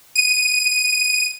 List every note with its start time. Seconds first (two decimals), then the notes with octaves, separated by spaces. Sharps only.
0.16 D#7